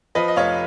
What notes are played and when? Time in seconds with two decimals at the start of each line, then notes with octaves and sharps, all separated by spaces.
0.15 F3 B4 D#5
0.28 D#5
0.36 F1 C#5 F5